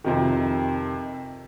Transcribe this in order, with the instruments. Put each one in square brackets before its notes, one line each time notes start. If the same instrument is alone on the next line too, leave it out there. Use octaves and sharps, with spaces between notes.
[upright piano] F2 C3 D#3